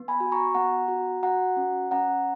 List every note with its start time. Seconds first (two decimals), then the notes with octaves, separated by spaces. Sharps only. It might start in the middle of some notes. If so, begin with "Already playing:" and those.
Already playing: B3
0.08 G#5 B5
0.20 F#4
0.32 A#5 C#6
0.55 B3 F#5 A#5
0.88 F#4
1.23 F#4 F#5 A#5
1.57 C#4
1.91 C#4 F#5 A#5